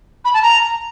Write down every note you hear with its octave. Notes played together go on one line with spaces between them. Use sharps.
B5
A5
A#5